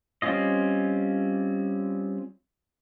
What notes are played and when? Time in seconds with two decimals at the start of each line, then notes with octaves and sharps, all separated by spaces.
0.22 G3 C4 C#4 F4 D#5